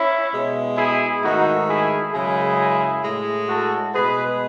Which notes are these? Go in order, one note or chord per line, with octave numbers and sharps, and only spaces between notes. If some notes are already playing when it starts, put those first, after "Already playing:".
Already playing: C#4 E4
B2 G#3
E4 G#4
G#2 D#3 A3 D#4 F#4
E4 G#4
F#2 C#3 G#3 E4 G#4
A2 G#3
F#4 A4
B2 G#3 G#4 B4